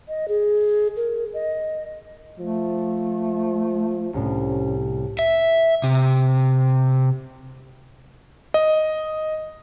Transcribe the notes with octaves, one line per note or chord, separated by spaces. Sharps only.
D#5
G#4
A#4
D#5
F3 A3
C2 A2 C#4
E5
C3
D#5